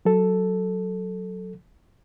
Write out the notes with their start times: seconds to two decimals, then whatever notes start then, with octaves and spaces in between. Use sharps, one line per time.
0.05 F#3 A4